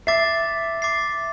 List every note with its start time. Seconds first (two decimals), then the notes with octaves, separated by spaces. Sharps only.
0.07 E5 D6 A6 C7
0.82 D6 A6 C7